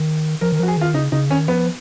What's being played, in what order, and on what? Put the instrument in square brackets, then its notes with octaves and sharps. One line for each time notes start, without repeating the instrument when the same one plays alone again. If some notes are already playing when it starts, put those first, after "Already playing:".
Already playing: [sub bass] D#3
[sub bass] F3 [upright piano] A#4
[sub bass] D#3
[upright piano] A#4
[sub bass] F3 [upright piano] F#4
[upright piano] G#4
[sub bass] D#3 [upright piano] F4
[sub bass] C#3 [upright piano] D#4
[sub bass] C#3 [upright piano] D#4
[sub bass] D#3 [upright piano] C#4
[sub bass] F3 [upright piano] B3